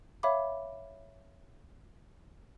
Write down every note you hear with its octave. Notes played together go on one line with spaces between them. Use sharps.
C#5 E5 F5 B5 D6